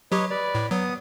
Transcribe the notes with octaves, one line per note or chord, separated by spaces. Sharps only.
F#3 G4 B4 C#5 D#5
B4 D5
A2
F#3 B3 D#6